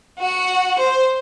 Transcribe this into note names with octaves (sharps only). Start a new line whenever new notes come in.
F#4 F#5
C5